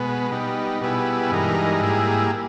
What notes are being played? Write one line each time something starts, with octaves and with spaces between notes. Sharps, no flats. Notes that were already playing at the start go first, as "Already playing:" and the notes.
Already playing: B2 G#3 B3
G3 B3 D#4
B2 G3 B3 E4 G#4
G2 E3 G#3 D#4 A#4
G#2 G3 A#3 E4 G#4